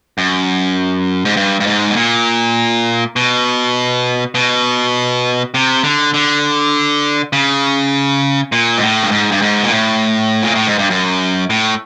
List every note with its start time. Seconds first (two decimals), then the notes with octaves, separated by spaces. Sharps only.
0.18 F#2
1.25 G#2
1.37 G2
1.60 G2
1.67 G#2
1.90 B2
1.96 A#2
3.16 B2
4.35 B2
5.54 C3
5.83 D3
6.14 D3
7.33 C#3
8.52 A#2
8.77 G#2
8.82 A2
9.03 G2
9.11 G#2
9.32 G2
9.42 G#2
9.63 A#2
9.71 A2
10.43 A#2
10.55 A2
10.67 G#2
10.78 G2
10.90 F#2
11.50 A2